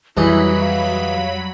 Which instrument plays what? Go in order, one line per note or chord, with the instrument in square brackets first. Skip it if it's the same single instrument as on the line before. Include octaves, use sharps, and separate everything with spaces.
[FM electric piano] F2 G3 [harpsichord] E3 D#4 G#4 [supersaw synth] F#3 B5 [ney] E4
[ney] F5